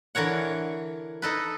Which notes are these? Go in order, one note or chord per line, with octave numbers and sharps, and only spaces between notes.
D3 E3 A#4 C#5 F#5
D#4 A4 B4